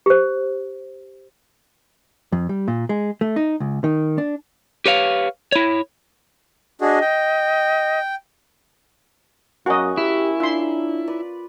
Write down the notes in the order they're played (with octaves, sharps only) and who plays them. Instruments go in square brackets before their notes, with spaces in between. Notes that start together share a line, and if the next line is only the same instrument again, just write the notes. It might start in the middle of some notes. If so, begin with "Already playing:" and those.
[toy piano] G4 C5
[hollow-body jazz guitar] F2
G3
A#2
G#3
A3
D#4
C#2
D#3
D4
[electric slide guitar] G4 B4 C#5 F5
E4 C#5
[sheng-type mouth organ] D4 F#4 G#4 [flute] D#5
[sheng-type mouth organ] G5
[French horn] F#2 [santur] A#3 C#4 [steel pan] F#4 D#5
[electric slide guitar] E4 [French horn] G4
[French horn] D4 [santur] F4 [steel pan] E5 C6
[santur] B4 D5